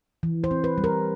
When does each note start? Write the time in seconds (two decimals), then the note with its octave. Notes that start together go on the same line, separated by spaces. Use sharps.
0.23 E3
0.44 C5
0.51 C4
0.64 B4
0.78 G3
0.84 A#4